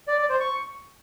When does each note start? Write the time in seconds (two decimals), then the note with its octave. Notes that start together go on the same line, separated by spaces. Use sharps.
0.08 D5
0.18 D5
0.29 C5
0.40 C#6